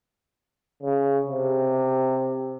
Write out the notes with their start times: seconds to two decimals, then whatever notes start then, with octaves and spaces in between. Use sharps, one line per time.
0.83 C#3
1.27 C3